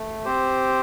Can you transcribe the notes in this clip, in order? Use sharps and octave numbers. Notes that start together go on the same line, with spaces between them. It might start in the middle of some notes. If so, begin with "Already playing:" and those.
Already playing: A3
C4 G4 C5